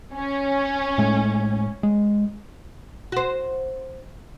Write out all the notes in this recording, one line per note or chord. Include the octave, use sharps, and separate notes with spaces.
C#4
A2 G#3 A3
G#3
F#4 C5